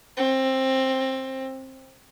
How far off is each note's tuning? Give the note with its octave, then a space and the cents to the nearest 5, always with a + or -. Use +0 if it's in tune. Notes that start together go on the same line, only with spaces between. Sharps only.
C4 +15